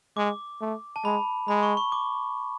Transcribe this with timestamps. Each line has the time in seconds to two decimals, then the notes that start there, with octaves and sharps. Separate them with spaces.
0.17 G#3 D6
0.61 A3
0.96 A5
1.04 G#3 B5
1.48 G#3 B5
1.63 C#6
1.77 C#6
1.92 D6